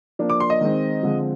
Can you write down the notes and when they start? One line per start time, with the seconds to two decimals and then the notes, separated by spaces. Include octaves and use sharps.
0.19 F3 A#3 D4
0.30 D6
0.40 C6
0.50 D#5
0.61 D#3 G#3 C4
1.03 D3 F3 G#3 C4